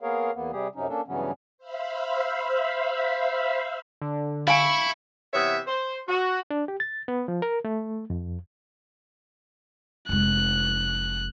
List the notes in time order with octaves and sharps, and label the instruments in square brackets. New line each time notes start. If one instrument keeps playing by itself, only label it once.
[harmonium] A#3 B3 G#4 A#4 C#5 F5
E2 A#3 B3
C3 G3 G4 G#4
F#2 C3 F#3 C#4 D#4
A#3 C#4 D4 A4
G2 C#3 E3 F#3 B3 C#4
[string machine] C5 E5 F5 B5
[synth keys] D3
[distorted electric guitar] E4 [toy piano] F5 G#5 [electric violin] B5 C#6
[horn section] C3 E3 B3 C#5 E5
C5
F#4
[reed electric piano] D4
G4
A6
B3
F3
A#4
A3
F2
[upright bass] F1 G#3 [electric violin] F#6